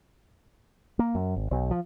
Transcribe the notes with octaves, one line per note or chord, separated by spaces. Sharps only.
A#3
F#2
G#1
B1
F3